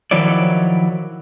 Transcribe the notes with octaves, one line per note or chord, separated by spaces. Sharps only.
D#3 F3 F#3 E4 C#5 D5